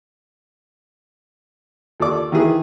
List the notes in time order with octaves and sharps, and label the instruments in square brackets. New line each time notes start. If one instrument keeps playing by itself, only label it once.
[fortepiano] D#2 F4 A4 D5 D6
D#3 E3 G#4 B4